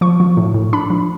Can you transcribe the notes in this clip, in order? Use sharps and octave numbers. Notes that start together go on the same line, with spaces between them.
F3 C#6
F3
A2
A2
D4 B5
F3